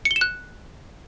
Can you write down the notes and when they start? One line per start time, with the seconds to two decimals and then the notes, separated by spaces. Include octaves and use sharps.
0.05 C#7
0.11 G7
0.16 E7
0.21 F#6